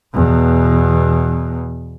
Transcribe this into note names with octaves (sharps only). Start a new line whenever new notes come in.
E2 B2